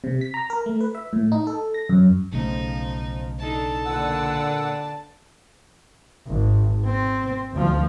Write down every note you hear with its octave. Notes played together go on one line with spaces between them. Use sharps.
C3
B6
A#5
A#4
A3
B4
E5
A2
D#4
A4
A#6
F#2
B1 C#3 F3 A3 D#4
D4 D#4 A4 A5
A#2 D3 B4 D5 F#5 E6
G#1
C4
D2 F3